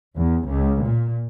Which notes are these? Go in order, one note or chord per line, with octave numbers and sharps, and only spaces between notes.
E2
C#2
A#2